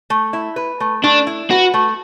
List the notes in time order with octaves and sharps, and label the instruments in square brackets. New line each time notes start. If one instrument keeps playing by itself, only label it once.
[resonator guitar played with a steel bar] A3
E4
B4
A3
[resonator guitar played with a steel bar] A3 [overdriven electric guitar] D4
[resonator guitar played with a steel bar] E4
[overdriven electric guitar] F#4 [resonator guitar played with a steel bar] B4
[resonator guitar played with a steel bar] A3